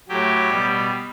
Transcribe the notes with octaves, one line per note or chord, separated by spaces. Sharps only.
A2 F#3 G4
B2 G3